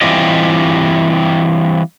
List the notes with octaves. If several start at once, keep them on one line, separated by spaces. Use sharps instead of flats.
E3 G3 C4 F4 G4 D#5